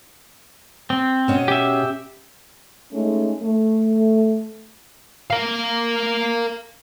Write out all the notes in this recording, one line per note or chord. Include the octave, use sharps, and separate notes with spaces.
C4
B2 C#4 G#4
G4 E5
G#3 A3 C#4 D#4
A3
A#4 F5